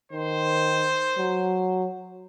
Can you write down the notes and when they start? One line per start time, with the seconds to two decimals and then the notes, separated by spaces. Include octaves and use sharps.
0.12 D#3 C5
1.18 F#3